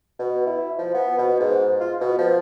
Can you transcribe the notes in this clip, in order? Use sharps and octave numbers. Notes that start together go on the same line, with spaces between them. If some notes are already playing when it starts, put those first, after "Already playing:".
B2
E4
F3
B3
B2
G#2
F4
B2
F3